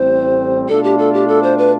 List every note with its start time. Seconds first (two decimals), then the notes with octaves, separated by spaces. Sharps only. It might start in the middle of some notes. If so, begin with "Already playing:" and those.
Already playing: A1 A2 G3 C4 C5
0.68 B2 A3 D4 F4 A4
0.84 G4
0.98 A4
1.14 G4
1.28 A4
1.43 C5
1.58 B4